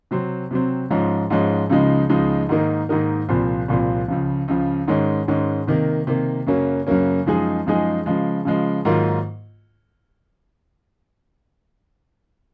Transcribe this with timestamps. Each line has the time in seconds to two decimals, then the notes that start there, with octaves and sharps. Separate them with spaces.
0.11 C3 F#3 C4
0.51 C3 F#3 C4
0.90 G#2 F3 G#3 C#4
1.30 G#2 F3 G#3 C#4
1.69 C#2 C#3 F3 G#3 D#4
2.09 C#2 C#3 F3 G#3 D#4
2.49 G#2 D#3 A#3 D#4 A#4
2.89 G#2 D#3 A#3 D#4 A#4
3.29 C2 A#2 F3 C4
3.68 C2 A#2 F3 C4
4.08 C#2 C#3 F3
4.48 C#2 C#3 F3
4.88 G#2 D#3 G#3 C#4
5.28 G#2 D#3 G#3 C#4
5.67 C3 D#3 A#3
6.07 C3 D#3 A#3
6.47 F#2 C#3 F#3 A#3 C#4
6.87 F#2 C#3 F#3 A#3 C#4
7.26 F#2 F3 G#3 D#4 G#4
7.66 F#2 F3 G#3 D#4 G#4
8.06 C#3 F3 G#3
8.45 C#3 F3 G#3
8.85 G#2 D#3 F#3 A#3 F4